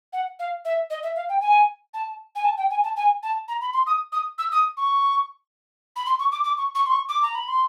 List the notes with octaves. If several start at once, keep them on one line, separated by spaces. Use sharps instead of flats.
F#5
F5
E5
D#5
E5
F5
G5
G#5
A5
G#5
A5
G5
G#5
A5
G#5
A5
A#5
B5
C6
D#6
D#6
E6
D#6
C#6
B5
C6
C#6
D6
D6
C#6
C#6
C6
C#6
D6
A#5
B5
C6